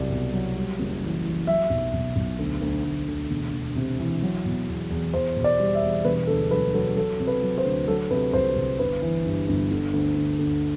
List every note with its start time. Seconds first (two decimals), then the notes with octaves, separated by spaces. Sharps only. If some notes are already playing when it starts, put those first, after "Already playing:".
Already playing: C2 F#3 D5
0.10 B2
0.33 F#3
0.56 G3
0.79 F#1
1.02 E3
1.25 E3
1.47 F#3 E5
1.70 B1
1.94 B1
2.16 B1
2.39 D2
2.62 D2
2.85 D2
3.08 D2
3.31 E1
3.54 E1
3.76 C3
4.00 E3
4.22 F#3
4.45 B2
4.68 E2
4.90 E2
5.14 E2 C5
5.37 B2
5.44 D5
5.60 G3
5.75 E5
5.82 E2
6.05 E1 B4
6.27 D2 A4
6.51 F#3 B4
6.74 F#3 A4
6.96 F#3 A4
7.20 C3
7.27 B4
7.42 F#3
7.58 C5
7.65 D2
7.88 F#3 A4
8.11 C3 B4
8.33 C2 C5
8.56 C3
8.79 G1 B4
9.02 E3
9.26 G2
9.49 G1
9.71 D3
9.93 D2
10.16 D3
10.39 D2